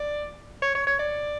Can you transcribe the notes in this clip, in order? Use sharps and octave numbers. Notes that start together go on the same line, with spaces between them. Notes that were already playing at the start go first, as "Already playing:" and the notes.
Already playing: D5
C#5
C#5
C#5
D5